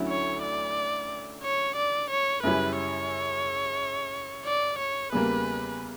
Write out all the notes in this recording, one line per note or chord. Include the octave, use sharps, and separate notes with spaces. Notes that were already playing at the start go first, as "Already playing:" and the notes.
Already playing: D2 D3 F#3 C#4 E4
C#5
D5
C#5
D5
C#5
F#2 C#3 G3 C#4 E4 B4
C#5
D5
C#5
E2 C#3 G3 A#3 B4